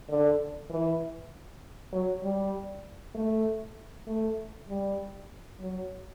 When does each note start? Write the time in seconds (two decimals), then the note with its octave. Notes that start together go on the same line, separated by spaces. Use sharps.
0.09 D3
0.70 E3
1.92 F#3
2.22 G3
3.15 A3
4.07 A3
4.68 G3
5.59 F#3